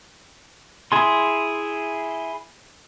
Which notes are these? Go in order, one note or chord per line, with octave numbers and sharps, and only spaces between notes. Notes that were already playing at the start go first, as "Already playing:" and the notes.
E4 G#4 C6